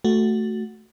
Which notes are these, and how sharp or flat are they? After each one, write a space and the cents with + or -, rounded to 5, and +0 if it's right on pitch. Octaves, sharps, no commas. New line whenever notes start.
A3 +0 F#4 +0